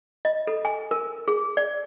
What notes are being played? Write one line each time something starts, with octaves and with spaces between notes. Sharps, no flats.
D#5
A4
G#5
A#4
G#4
D5